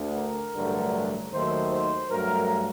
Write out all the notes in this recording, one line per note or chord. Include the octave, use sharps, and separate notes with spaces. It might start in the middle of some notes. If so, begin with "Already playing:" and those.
Already playing: D2 D3 A3
A#4
A1 G2 D3 F#3 A3
D#2 D#3 F#3 A3 C5
C5
G2 F#3 A3 A#4